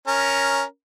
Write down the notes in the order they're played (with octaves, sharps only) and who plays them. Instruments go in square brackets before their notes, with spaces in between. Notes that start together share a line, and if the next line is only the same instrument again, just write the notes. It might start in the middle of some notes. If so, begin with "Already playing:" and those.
[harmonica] C#4 A#4